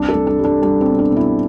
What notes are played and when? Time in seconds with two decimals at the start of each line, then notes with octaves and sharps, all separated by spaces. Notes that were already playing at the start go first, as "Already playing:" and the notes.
Already playing: C2 D4
0.09 A4
0.15 C2
0.27 D4
0.39 G3
0.45 D4
0.63 G3 D4
0.81 C4
0.87 B2
0.99 D4
1.11 B2
1.16 E4